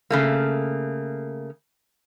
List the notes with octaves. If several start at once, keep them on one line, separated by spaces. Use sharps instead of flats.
C#3 A3 A#3